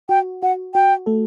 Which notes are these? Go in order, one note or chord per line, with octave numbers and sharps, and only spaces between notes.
F#4 G5
F#4 F#5
F#4 G5
A3 A4